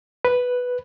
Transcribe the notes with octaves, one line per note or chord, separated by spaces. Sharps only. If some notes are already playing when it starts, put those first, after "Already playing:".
B4